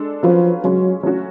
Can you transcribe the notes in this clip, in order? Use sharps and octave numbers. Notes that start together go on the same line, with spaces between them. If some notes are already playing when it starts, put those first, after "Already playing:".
Already playing: G#3 D4 A4
F3 F#3 C#4 F4 B4
C#3 F#3 G#3 C#4
F#3 A3 C#4 F#4